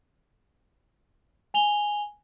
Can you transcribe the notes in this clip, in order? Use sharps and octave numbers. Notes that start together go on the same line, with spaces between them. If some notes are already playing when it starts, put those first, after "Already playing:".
G#5 F7 G7